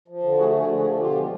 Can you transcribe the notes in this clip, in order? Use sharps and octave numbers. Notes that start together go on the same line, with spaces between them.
F3
D3
A3 F#4 G#4
D3
F#4 G#4
F3
F#4 G#4
D3
B2 F4 G4
G#3